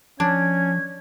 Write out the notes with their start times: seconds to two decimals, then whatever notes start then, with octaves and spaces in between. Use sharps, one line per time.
0.20 F3 C#4 D4 G#6